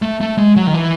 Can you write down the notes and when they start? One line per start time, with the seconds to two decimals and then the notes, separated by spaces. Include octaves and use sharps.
0.02 A3
0.21 A3
0.38 G#3
0.56 F#3
0.67 D#3
0.74 E3